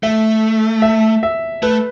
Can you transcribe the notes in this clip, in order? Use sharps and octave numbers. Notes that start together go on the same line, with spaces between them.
A3 E5
E5
E5
A3 B4